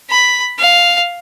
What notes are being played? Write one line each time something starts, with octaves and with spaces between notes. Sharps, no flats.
B5
F5